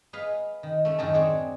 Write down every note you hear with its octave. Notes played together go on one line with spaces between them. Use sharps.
G#4 B4 D#5 F5
D#3
A3 C#4
F#2 A2 D#3 F#4 G#4 A5
C4 D4 G#4 C#5